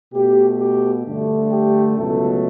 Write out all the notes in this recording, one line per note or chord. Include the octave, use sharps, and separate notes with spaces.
B2 A3 G4
G4
G2 D3 A3
G4
C#2 B2 F#3 A3 A4